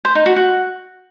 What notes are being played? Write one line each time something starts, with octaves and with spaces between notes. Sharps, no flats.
C5
D#4
F#4
F#4